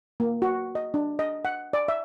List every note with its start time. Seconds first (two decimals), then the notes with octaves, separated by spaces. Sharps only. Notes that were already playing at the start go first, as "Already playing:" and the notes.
0.20 A#3
0.42 F#4
0.75 D#5
0.94 D4
1.19 D#5
1.45 F#5
1.73 D5
1.88 E5